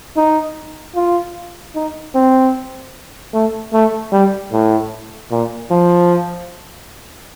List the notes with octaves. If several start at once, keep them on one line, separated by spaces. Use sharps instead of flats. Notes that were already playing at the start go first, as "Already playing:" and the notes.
D#4
F4
D#4
C4
A3
A3
G3
A2
A#2
F3